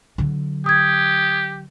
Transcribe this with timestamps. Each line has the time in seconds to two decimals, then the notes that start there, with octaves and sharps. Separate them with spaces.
0.18 D3 F#3
0.66 G4 D#6 G#6